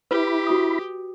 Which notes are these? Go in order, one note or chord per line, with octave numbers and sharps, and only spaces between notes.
E4 G4 B4 B5
F#4 D#6